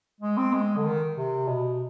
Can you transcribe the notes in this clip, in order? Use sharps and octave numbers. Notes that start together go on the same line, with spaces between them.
G#3
C4
G#3
D3
D#3
C3
B2